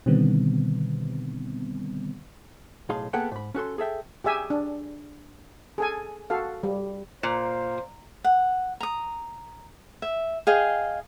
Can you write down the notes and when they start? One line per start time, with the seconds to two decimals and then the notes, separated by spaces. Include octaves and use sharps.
0.06 B2 D3 D#3 G3 B3 C4
2.89 B1 A2 G#4 F5 C6
3.13 A#3 B3 G#4 A4 F#5 G5
3.31 G#2 B5
3.54 C#4 F#4 A4 C6
3.78 G#4 A4 E5 G5
4.24 G4 G#4 E5 G#5
4.50 D4
5.78 G#4 A4 G#5
6.30 F#4 A4 F5
6.63 G3
7.23 A#2 C5 F5
8.24 F#5
8.80 A#5 D#6
10.02 E5
10.47 G#4 D#5 F5 G5